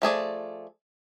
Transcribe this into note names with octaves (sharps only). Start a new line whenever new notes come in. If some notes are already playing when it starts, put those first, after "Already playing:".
F3 A3 G#4 D5